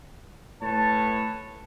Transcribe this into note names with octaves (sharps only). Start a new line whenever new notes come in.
A2 B4 C#5 A5